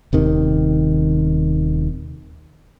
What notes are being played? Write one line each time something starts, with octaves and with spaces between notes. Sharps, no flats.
D#1 C3 D#3